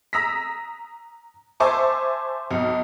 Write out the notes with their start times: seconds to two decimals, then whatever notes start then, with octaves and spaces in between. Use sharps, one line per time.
0.13 A#5 D#6 E6 A#6 B6
1.60 C5 E5 G#5 A5 C#6 D6
2.51 B1